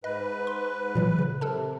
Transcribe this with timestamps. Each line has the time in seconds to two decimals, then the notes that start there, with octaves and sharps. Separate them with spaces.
0.04 G#2 B4 D#5
0.47 C6
0.95 A#2 E3 F#3
1.19 C#3
1.41 C3 A4 A#4 A5